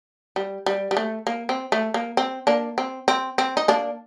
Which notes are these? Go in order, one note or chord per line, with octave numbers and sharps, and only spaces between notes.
G3
G3
G3
A3
A#3
C4
A3
A#3
C4
A#3 D4
C4
C4
C4
D#4
A#3 D4